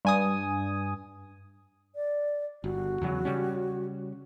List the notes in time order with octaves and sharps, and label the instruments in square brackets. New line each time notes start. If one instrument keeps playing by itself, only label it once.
[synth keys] G2 G#5 D#6
[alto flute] D5
[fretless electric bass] G1 [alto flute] F#4
[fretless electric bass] E2 C#3 F#3
C#3 G3 C#4